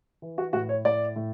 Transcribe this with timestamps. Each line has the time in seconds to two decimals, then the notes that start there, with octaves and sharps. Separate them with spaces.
0.22 E3
0.38 F#4
0.53 A2 F#4
0.69 C#5
0.85 A2 D5
1.16 A2